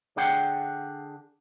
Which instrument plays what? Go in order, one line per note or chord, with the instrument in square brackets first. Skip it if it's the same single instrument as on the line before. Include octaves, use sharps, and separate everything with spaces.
[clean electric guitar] D3 D4 G#4 F#5 G5